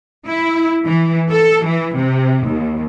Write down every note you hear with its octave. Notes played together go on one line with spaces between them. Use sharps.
E4
E3
A4
E3
C3
D#2